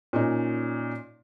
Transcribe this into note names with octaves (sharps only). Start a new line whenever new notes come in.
A#2 C#4 D#4